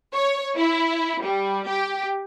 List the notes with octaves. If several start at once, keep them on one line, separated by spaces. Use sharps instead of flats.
C#5
E4
G3
G4